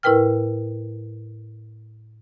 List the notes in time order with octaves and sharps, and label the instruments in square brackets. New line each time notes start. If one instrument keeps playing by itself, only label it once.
[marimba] A2 E4 A#4 B4 G5 F6